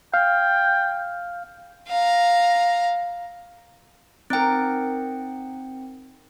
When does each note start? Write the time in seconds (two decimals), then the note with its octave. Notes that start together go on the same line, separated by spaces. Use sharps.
0.14 F5 G5
1.88 F5 A#5
4.30 C4 D#4 A#4 G5